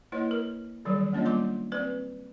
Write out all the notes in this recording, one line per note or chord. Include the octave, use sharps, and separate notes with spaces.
A#3 E4 B4 C#5 D#5
A#4
D3 D#3 F#3 G3 A#4 C#5
A#3 C#4 D4 F4 C#5 D#5
G3 B3 C6 D6
C4 B4 D5